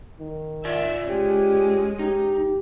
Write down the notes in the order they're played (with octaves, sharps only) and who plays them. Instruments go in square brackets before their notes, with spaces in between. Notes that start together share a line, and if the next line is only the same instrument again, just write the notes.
[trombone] D#3
[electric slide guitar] F4 D5 G#5 [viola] E5
[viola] G#3 C#4 [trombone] G4
[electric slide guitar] D#4 [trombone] G4